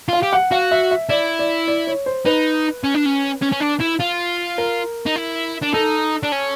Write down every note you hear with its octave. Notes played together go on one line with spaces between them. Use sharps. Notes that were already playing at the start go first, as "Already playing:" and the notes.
F4 F5
G4
F#5
F#4 F5
E5
E5
E4 D5
D5
D5
C#5
C5
D#4 B4
C#4
D4
C#4
C#4
C#4
D4
E4
F4
A#4
D#4
E4
D4
D#4 A4
D4
C#4